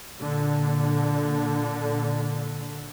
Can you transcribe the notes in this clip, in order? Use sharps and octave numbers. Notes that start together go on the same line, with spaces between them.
A#2 D3